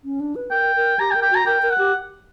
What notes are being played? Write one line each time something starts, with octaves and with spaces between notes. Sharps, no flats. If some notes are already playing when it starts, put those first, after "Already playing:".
C#4
D4
B4
A#4 G5
A#4
G4 A#5
G5
A#4
G5
F#4 A#5
A#4 G5
A#4
F#5
G4